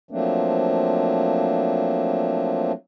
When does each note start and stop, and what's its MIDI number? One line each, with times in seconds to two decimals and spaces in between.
0.11 2.72 53
0.11 2.72 54
0.11 2.72 57
0.11 2.72 58
0.11 2.72 60
0.11 2.72 62